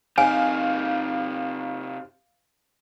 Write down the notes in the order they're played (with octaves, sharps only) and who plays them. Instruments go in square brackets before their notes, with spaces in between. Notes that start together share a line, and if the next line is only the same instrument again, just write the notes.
[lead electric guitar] C3 D#4 [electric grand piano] F5 [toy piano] G#5